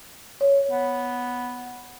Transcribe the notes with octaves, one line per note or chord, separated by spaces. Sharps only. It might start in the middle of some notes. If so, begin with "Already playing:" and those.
C#5
B3